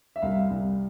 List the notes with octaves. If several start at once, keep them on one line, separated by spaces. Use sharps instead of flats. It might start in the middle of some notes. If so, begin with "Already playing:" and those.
E5
C2 F5
C2